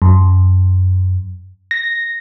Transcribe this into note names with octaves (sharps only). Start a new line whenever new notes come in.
F#2
A#6